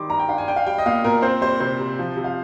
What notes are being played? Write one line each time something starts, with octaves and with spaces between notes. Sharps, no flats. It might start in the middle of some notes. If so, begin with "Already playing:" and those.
Already playing: D#3 G3 C6 D6
G2 A#5
G5
D4 F5
G#5
D4 G5
F5
G3 G5
D#5
A#2 F5
A#2 A#4
C4 C5
G3 C5
C3 C5
C3
F3
C3
F5